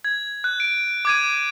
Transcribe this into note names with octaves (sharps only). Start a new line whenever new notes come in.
G#6
F#6
D7
D6 G#6 D#7